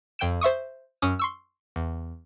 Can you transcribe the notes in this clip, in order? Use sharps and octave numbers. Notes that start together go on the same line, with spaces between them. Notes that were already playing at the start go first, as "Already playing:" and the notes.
F2 G5 G6 D7 E7
C5 E5 C#6 D#6
F#2 C#4 D#6
C6 C#6 E6
E2